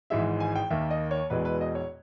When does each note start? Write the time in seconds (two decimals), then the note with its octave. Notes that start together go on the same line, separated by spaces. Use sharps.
0.10 G#1 G#2 E3 G#3 E5
0.40 G#5
0.56 G5
0.70 D#2 D#3 A#3 E5
0.90 D#5
1.11 C#5
1.30 E1 E2 B2 G#3 B4
1.45 B4
1.61 D#5
1.75 C#5